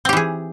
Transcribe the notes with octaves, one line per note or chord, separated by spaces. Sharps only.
E3 C4 G4 G#4